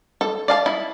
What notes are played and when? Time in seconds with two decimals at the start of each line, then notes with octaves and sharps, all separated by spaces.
0.21 A4
0.48 D5 F5 A5
0.66 E4